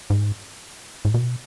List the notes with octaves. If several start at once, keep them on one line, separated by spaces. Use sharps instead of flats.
G#2
A2
B2